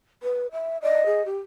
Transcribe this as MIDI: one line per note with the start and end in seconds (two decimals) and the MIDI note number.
0.23 0.47 71
0.52 0.77 76
0.83 1.06 74
0.83 1.21 75
1.06 1.23 68
1.26 1.37 67